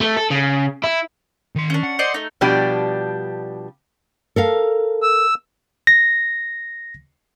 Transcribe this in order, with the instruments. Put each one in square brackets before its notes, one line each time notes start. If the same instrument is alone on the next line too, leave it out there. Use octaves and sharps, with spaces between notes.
[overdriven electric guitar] A3
A4
C#3
E4
[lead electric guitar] D#3 C6
[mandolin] C#4 D4
[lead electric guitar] F#5
[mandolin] C5 D5 D#5
A3 D#4
[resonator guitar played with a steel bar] B2 F3 G3 D4 G4
[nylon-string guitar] A4 A#4 F5
[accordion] E6
[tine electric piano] A#6